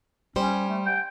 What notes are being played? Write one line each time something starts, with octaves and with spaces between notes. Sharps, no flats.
G3 C#4 C5
A3
G5